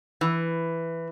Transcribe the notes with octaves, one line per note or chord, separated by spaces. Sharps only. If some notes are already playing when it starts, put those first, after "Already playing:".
E3